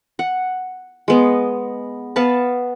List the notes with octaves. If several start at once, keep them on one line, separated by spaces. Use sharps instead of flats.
F#5
G#3 B3 D#5
B3 B4 F5 A5